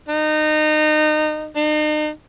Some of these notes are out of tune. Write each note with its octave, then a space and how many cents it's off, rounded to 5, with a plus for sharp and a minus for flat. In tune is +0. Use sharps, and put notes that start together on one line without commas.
D#4 -25
D#4 -40